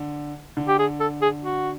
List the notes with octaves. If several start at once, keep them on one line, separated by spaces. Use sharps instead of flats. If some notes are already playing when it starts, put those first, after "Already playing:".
Already playing: D3
D3
G4
G#4
A4
G#4
F#4